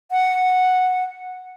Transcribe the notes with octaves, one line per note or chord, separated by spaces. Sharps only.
F#5